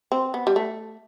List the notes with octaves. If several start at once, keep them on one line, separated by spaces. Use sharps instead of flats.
C4
B3
G3
A3